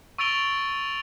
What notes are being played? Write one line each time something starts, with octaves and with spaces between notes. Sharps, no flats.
C#6 E6 A6 D7 F7 G7